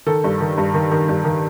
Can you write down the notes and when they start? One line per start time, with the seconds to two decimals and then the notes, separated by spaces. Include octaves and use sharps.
0.06 D#3 A4
0.24 G2
0.40 D#3
0.58 G2
0.74 D#3
0.91 D#3
1.09 G2
1.25 D#3